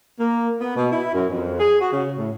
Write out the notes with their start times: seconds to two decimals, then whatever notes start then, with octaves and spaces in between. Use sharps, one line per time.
0.19 A#3
0.60 B3
0.76 B2
0.91 E4
1.14 F#2
1.30 F2
1.60 G#4
1.80 F#4
1.92 C#3
2.18 A2